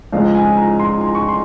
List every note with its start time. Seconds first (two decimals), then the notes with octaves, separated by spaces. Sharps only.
0.13 C#2 C#3 F3 G#3 F5
0.35 G#5
0.57 A#5
0.79 C6
1.01 C6
1.15 C#6
1.28 C6